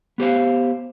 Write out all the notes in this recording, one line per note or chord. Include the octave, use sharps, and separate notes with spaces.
B3 G4 C5 F5